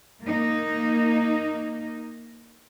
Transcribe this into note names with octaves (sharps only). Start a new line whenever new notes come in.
A#3 D#4